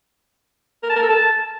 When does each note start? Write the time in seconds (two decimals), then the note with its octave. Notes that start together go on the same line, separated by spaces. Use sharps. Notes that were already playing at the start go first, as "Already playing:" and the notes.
0.83 A#4
0.90 A5
0.96 A#4
1.03 A4
1.09 A5